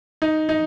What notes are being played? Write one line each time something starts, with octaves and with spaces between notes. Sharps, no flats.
D#4
D#4